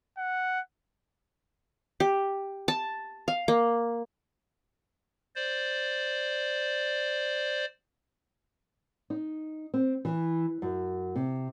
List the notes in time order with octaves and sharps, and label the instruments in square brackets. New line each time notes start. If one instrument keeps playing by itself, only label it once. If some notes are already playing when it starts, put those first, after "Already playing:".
[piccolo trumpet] F#5
[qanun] G4
A5
F5
A#3
[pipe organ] C5 D5
[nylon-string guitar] D#4
C4
E3
F#2
C3